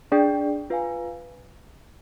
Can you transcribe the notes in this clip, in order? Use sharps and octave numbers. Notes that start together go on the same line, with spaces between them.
D4 G#4 D5 G5
F4 B4 F5 G#5